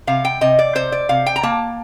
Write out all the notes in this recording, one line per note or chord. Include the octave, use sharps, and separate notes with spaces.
C3 F5
G5
C3 D#5
D5
C3 C5
D5
C3 F5
G5
A#5
A#3 A5